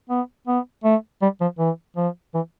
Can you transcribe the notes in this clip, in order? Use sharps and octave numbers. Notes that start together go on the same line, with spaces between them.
B3
B3
A3
G3
F3
E3
F3
E3